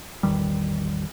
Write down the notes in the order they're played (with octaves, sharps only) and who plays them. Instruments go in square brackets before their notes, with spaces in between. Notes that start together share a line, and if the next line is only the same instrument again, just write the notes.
[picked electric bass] A1 E2 D#3 G3